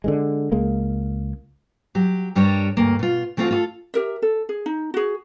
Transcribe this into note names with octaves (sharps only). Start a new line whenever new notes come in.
D3 D#3 G#3
C#2 G#3 A#3
F#3 G4
G2 G3 D4 A#4 C#5
D2 G2 A#3
B2 F4
E3 A3 C4 D#4 F4 F#4
F4 F#4 A4
G4 A#4 E5
A4
G#4
D#4
F#4 G#4